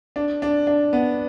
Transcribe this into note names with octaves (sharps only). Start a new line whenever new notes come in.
D4
D4
D4
B3